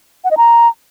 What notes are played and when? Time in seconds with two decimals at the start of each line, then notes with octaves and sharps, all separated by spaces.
0.24 F#5
0.31 D#5
0.37 A#5